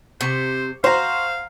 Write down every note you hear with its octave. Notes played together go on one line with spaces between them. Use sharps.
C3 C5 C#6
F#4 C5 F5 A#5 C6